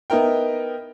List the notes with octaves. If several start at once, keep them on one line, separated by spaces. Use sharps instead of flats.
B3 D#4 E4 A#4 G5